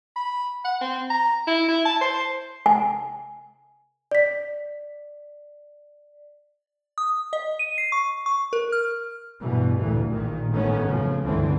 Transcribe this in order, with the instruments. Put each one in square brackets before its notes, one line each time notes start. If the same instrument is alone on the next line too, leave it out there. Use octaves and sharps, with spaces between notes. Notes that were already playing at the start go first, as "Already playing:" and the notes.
[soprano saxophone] B5
F#5
C4
A#5
E4
E4
A5
C5
[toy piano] G#5
[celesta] D5 B6
[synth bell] D#6
D#5
D#7
C7
C#6
C#6
A#4
F6
[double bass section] G2 B2 E3
D2 A#2 E3
A#1 A#2 D#3
A1 G#2 D#3 A3 B3 C#4
F2 C#3 F3
C#2 G2 D3 E3 C4